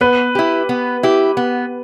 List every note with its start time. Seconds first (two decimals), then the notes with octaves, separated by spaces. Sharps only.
0.01 B3 B4
0.35 E4 G4
0.69 B3
1.03 E4 G4
1.37 B3